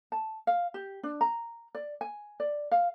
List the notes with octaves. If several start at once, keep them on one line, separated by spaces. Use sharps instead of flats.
A5
F5
G4
D4
A#5
D5
G#5
D5
F5